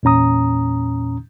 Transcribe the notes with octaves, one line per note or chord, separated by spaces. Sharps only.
E2 A#2 C#4 A#5 D#6